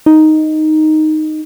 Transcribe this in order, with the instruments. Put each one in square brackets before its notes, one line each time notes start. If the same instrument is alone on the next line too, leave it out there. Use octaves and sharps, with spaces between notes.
[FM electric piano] D#4